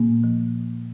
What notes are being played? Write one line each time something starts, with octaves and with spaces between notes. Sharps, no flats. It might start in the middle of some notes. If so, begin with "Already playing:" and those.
Already playing: A#2 A#3
F3